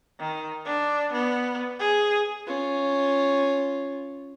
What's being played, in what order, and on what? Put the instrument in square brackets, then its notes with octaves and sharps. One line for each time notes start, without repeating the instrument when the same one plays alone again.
[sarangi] D#3
D4
B3
G#4
[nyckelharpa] C#4 F4